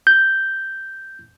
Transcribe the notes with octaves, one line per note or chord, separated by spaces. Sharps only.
G6